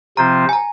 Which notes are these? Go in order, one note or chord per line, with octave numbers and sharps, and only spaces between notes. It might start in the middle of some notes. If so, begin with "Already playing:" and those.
C3 F3 C4 F4 C5 A#5
G#5
A#5